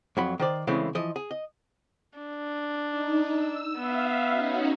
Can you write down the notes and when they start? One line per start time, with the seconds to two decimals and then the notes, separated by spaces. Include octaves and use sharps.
0.17 F2 F#3 B5
0.39 D#3 C5 D5
0.67 C#3 E3 G#3 A3 C4 C#4
0.95 E3 F3 D#5
1.16 G#4
1.31 D#5
2.18 D4
2.91 D#4
3.28 E6
3.78 B3 E5 F5
4.28 C#4 D#4 F#4